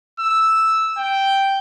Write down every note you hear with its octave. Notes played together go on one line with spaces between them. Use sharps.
E6
G5